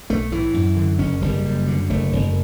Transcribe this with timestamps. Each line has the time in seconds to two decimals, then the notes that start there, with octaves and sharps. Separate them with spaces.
0.10 B1 A3
0.31 A2 E3
0.54 F#2
0.76 D3
0.99 F#1 C#4
1.22 F#1 G3
1.45 F#2
1.68 D3
1.90 F#1 A3
2.12 F#1